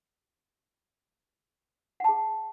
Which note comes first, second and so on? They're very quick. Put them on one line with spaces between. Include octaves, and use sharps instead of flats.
F#5 A5 G#4